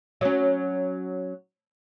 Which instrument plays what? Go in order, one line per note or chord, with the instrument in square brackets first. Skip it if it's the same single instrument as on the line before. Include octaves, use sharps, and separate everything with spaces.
[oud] F#3 C#4